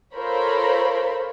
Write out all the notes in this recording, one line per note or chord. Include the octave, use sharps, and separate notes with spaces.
F4 A4 A#4 C5 C#5 B5